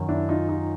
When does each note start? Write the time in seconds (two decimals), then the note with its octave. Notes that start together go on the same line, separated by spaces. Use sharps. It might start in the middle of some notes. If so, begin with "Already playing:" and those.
Already playing: F#2 D#3
0.09 D4 E4
0.29 D#4 F4
0.49 D#4 F4